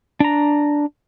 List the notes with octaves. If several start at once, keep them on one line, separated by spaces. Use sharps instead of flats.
D4 A#5